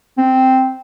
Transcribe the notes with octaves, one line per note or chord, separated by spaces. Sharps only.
C4